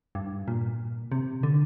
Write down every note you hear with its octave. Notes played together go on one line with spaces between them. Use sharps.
G2
A#2
C3
D3